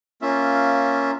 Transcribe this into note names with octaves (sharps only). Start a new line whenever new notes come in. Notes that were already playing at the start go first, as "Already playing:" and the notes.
A#3 C#4 F4 E5